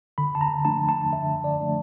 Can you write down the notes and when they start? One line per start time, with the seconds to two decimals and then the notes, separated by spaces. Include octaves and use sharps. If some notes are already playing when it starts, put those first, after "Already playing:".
0.18 D3 B5
0.35 A5
0.41 A#5
0.65 F3 A3 D4 A5
0.89 A5
1.13 D3 E5
1.44 D5
1.60 F3 A3 D4